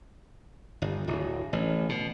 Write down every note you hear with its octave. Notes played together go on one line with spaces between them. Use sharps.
G1
D1
A1
B2